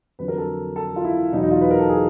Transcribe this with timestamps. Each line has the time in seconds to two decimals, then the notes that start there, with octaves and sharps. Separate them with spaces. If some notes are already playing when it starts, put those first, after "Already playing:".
0.19 F2 D3 F#3 B4
0.28 A#4
0.38 A4
0.76 A4
0.96 F4
1.04 E4
1.32 E2 B2 F#3 D#4
1.43 D#4
1.51 F4
1.61 B4
1.70 A#4
1.79 A4
1.89 G#4